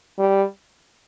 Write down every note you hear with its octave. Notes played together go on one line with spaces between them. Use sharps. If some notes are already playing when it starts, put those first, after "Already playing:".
G3